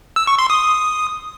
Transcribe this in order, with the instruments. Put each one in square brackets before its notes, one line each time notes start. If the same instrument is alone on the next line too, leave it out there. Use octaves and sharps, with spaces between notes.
[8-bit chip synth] E6
C#6
C6
D#6